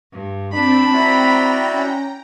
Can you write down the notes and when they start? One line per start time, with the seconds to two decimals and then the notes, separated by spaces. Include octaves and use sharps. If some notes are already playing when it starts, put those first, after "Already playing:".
0.12 G2
0.53 C4 D4 A5 B5
0.93 C4 E4 F#4 D5 G5 A#5
1.73 C#4